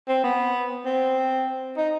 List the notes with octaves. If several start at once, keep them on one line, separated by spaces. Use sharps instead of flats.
C4
B3
C4
D#4